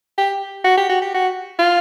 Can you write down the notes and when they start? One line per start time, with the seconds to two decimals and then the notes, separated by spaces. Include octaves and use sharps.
0.18 G4
0.64 F#4
0.77 G4
0.89 F#4
1.02 G4
1.14 F#4
1.59 F4